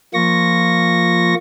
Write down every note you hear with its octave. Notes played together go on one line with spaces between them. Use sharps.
F3 A#3 F4 C#6 A#6